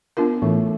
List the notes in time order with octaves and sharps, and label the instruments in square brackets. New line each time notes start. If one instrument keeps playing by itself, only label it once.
[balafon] B3 D4 F4 A#4
[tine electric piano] A2 A3 [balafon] E3